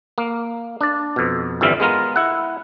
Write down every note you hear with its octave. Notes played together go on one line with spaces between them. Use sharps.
A#3
D4 D5
F2 B2
G1 F2 E3 G3 E5 F5
G#3 B3 F4 A#4
E4 F#5